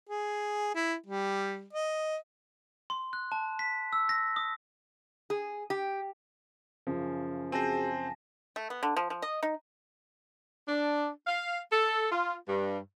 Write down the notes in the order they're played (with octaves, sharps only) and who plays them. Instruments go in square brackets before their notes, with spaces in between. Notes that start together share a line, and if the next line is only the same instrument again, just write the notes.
[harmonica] G#4
E4
G3
D#5
[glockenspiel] C6
F#6
A5
B6
E6
A#6
D#6
[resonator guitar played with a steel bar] G#4
G4
[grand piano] F#2 C#3 F3
[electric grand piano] C4 C5 [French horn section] F#4 G#4 [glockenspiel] G#5 A5 A#6
[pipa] A3
B3
D3
F3
F3
D#5
D#4
[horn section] D4
F5
A4
F4
G2